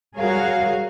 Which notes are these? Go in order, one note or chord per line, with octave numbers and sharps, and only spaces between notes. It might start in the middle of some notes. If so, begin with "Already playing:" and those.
G3 F#4 G#4 A#4 C#5 F5